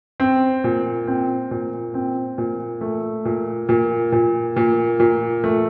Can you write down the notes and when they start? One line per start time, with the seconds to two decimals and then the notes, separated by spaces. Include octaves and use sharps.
0.20 C4
0.64 A#2
1.07 C4
1.51 A#2
1.94 C4
2.38 A#2
2.81 A3
3.25 A#2
3.69 A#2
4.12 A#2
4.56 A#2
5.00 A#2
5.44 A3